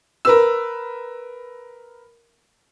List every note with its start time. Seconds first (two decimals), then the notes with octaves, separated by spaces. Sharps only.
0.25 A#4 B4 E6